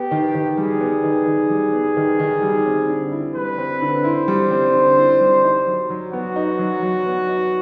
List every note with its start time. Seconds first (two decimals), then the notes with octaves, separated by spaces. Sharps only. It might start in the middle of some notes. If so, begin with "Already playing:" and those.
Already playing: B3 G4
0.11 D#3
0.35 D#3
0.57 G3 G#4
0.81 B3
1.04 D#3
1.27 D#3
1.50 G3
1.73 B3
1.97 D#3
2.19 D#3
2.42 G3
2.66 C4
2.89 D3
3.12 E4
3.35 G3 B4
3.58 C4
3.82 D3
4.04 E4 C5
4.28 G3
4.51 C4
4.74 D3
4.97 E4
5.21 G3
5.44 D#4
5.67 F#3
5.90 F#3
6.13 B3 F#4
6.36 D#4
6.59 F#3
6.82 F#3
7.06 B3
7.29 D#4